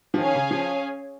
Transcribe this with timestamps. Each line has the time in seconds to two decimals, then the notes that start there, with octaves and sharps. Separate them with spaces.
0.14 F3
0.18 D#3 C#4 G#4 C#5 F5 G#5
0.35 C#3
0.51 F3